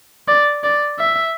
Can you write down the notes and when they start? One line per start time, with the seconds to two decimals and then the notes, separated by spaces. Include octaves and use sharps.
0.28 D5
0.64 D5
0.99 E5